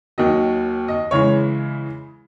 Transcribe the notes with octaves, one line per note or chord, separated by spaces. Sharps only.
D#2 D#3 F#3 D#5
D#5
C#3 E3 G#3 C#5